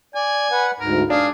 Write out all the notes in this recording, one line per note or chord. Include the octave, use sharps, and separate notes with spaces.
D5 G#5
B4 F#5
D2 G#2 A#4
D4 G#4 F5